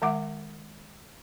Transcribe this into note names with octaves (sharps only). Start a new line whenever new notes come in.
D#3 G#3 E5 F#5 D6